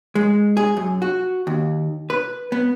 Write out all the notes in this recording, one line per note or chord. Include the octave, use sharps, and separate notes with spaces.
G#3
G#4
F#2
F#4
D#2
B4
B3